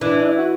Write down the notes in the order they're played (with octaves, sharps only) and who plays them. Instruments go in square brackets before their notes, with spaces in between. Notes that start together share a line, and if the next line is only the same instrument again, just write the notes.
[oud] E3 [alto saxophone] D4
[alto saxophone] D4
E4
F#4